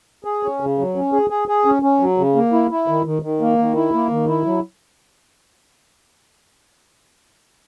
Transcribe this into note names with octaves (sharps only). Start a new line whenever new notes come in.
G#4
C#4
C#3
F#3
C#4
G#4
G#4
G#4
C#4
C#4
F#3
C#3
A#3
E4
E4
D#3
D#3
D#3
A#3
D#3
E4
A#3
D#3
E4
F#3